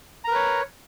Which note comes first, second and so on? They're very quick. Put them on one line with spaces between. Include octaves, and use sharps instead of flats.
A#5 A#4 B4 C#5